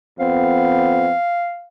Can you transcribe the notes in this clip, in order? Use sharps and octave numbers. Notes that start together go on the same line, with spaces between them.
F2 B3 C4 F5